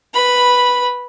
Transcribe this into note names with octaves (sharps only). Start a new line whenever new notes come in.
B4 B5